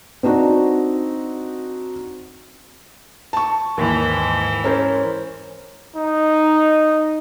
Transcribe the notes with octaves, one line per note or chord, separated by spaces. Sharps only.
C4 D4 D#4 F#4
A5 C#6
D#2 G#2 E3
C#4 A#4 C5
D#4